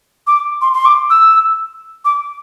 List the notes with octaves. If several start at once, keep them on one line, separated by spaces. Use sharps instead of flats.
D6
C6
C6
D6
E6
D6